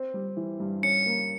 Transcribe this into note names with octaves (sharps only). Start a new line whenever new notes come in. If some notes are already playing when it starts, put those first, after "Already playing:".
Already playing: C4
G3
E3
G2
C#4 C#7
A#3